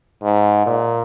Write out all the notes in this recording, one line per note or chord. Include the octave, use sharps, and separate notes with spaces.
G#2
A#2